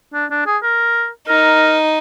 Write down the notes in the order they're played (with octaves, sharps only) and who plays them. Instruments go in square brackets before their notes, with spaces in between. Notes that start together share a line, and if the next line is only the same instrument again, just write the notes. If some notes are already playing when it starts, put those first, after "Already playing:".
[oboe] D4
D4
G#4
A#4
[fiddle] D#4 [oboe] A#4